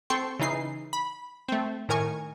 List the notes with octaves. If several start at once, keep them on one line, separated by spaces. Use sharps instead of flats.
C4 A4 G5 C6 C#6
C#3 E3 D#4 C7
B5
A3 C4
A2 D#3 A#4 G#5 C#6